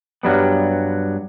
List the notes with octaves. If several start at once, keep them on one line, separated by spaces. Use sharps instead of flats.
G2 F#3 G3 B3